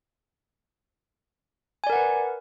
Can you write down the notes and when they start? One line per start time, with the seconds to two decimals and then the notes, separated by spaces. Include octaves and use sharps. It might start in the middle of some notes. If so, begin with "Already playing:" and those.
1.84 G#5
1.87 D5
1.90 A#4
1.93 F#5
1.96 B4